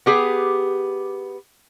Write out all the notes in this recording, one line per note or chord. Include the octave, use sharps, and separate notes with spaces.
B3 G4 G#4